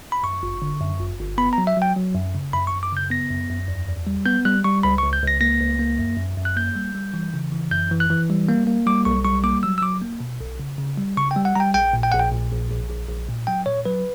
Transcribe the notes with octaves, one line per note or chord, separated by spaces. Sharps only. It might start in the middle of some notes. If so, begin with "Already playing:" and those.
B5
F#2 C#6
G1
D3
F#2
G1
G1
B3 B5
A#5
F#3
E5
F#3 G5
F#3
F#2
C#3
F#2 B5
C#6
F#2
D6
C#3 G6
B3 A#6
F#2
F#2
E2
E2
G3
B3 G6
G3 F#6
G3 C#6
C#2 B5
C#6
C#2
G6
C#2 A#6
A#3 A#6
C#2
A#3
F#2
F#2
F#2
F#6
A#3 G6
G3
G3
E3
C#3
E3
F#2 G6
E3
F#6
E3
G3
A#3
A#3
G3 D6
B1 C#6
G3 C#6
A#3 D6
F#3 E6
E6
F#3 D6
A#3
B2
B1
C#3
C#3
G3
C#3 C#6
G5
G3
F#5
G3 G5 A#5
A#1 G5
A#2
G5
A#1 F#5
G5
A#2
A#1
A#1
A#1
A#1
A#2
F#3 G5
A#2 C#5
F#3 B4